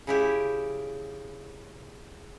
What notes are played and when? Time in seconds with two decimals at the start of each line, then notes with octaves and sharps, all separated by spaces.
0.07 C#3 E4 G4